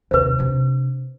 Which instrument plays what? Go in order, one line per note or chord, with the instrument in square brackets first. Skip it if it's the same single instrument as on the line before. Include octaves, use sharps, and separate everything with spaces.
[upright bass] D#2 C3 [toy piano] B4 C5
[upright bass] C3 D4